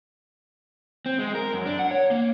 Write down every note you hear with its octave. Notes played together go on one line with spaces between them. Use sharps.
C4
G#3
A#4
F#2
D4
F#5
C#5
A#3